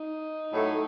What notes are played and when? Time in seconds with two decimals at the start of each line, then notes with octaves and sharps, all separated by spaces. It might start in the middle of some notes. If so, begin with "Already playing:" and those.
Already playing: D#4
0.50 A2 F#3 A3